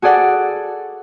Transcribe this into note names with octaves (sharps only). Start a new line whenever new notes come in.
F#4 G#4 A4 D5 F#5